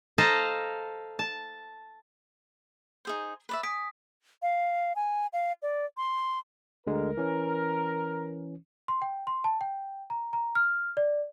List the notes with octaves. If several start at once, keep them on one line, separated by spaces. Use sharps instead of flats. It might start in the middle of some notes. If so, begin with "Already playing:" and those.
A4 C5 D#5 F5 A5 A#5
A5
D#4 G#4 C5
B4 D5 E5
G#5 D#6 B6 D7
F5
G#5
F5
D5
C6
D2 D3 G#3 A#4
E3 C#4
C6
G5
C6
A5
G5
A#5
A#5
F6
D5